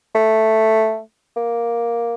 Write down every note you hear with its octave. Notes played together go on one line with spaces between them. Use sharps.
A3
A#3